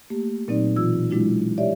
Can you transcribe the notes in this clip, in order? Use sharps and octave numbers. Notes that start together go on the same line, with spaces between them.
A3 A#3 G4
A#2 F#3 C4 D#4 D5
B2 E3 F4 E6
F#3 G#3 D4 E4 F#4
G4 C#5 D5 E5